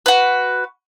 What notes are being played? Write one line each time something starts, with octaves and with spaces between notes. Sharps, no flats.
F#4 B4